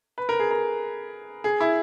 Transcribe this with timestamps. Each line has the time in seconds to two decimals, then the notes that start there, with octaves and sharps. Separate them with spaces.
0.18 B4
0.29 A#4
0.39 G#4
0.51 A#4
1.44 G#4
1.60 E4